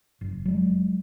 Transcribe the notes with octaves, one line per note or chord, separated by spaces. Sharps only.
F#1
F#3 G#3